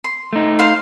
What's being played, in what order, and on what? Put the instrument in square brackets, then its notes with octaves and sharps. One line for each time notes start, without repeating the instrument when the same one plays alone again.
[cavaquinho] C6
[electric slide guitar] A3 D#4
[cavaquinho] C5 F5 C6